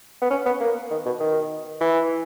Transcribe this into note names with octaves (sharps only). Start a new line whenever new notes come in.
B3
C#4
B3
A#3
D#3
B2
D#3
E3